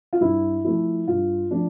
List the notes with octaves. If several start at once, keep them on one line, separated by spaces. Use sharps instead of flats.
F4
G2 E4
F3 A3 E4
G2 F4
F3 A3 D4